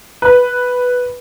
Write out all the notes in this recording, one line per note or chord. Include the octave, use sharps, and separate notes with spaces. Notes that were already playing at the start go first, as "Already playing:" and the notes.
B4